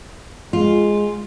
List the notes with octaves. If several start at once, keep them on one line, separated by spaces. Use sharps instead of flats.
G#3 F4